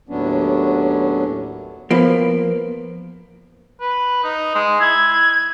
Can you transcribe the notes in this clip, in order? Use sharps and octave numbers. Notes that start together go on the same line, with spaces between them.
D#2 A2 F#3 B3 C#4 D4
F3 A#3 B3 B4
B4
D#4
G#3
E4 G#6